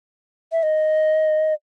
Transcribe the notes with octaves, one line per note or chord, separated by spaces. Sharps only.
E5
D#5